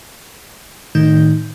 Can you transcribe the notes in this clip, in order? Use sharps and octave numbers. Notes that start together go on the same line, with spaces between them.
A2 D#3 D#4 G6